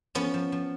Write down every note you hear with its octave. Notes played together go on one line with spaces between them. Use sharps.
F3 B3 C#4
F3
F3